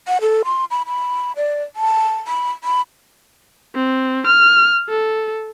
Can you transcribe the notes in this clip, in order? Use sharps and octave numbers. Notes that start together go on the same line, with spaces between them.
F#5
A4
C6
B5
B5
D5
A5
B5
B5
C4
F6
A4